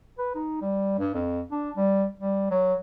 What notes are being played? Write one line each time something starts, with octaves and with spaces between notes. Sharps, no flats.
B4
D#4
G3
G2
F2
D4
G3
G3
F#3